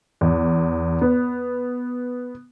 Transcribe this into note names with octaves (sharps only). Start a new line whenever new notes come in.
E2
B3